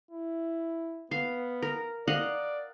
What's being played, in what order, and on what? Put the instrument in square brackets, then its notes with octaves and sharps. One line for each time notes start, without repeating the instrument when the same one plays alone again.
[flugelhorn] E4
[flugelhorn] B3 [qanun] F5
[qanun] A#4
[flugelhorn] D5 [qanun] D#5 F5 F#5